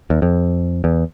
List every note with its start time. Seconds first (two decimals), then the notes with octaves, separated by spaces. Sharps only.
0.10 D#2
0.22 F2
0.84 E2